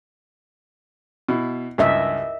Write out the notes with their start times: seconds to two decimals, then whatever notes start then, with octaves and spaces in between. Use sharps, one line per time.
1.29 B2 E4
1.78 C#2 G2 A#4 D#5 E5